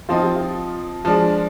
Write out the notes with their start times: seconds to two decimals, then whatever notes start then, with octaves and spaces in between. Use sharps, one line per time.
0.09 F3 C4 D#4 F4
0.22 G4
0.36 F4
1.04 F3 G#3 D4 F4